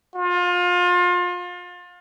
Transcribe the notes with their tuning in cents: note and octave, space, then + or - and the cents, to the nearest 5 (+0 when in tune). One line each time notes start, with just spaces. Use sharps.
F4 +30